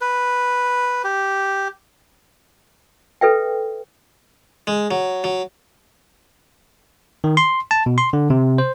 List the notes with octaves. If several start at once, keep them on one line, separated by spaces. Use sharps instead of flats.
B4
G4
A4 B4 E5 G5
G#3
F#3
F#3
D#3
C6
A5
B2
C6
D3
C3
C5